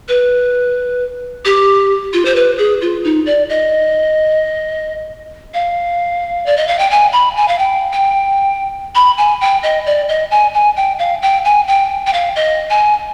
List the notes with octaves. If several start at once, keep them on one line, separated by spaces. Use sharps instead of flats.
B4
G4
F4
C5
B4
G#4
F4
D#4
D5
D#5
F5
D5
D#5
F5
G5
G#5
B5
G#5
F5
G5
G5
B5
G#5
G5
D#5
D5
D#5
G#5
G#5
G5
F5
G5
G#5
G5
G5
F5
D#5
G#5